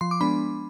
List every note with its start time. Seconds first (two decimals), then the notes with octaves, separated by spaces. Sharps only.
0.01 F3 C6
0.11 D6
0.21 G#3 B3 D4 B5